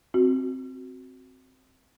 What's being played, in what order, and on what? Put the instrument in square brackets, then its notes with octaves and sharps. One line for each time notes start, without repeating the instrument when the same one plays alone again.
[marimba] C4 F#4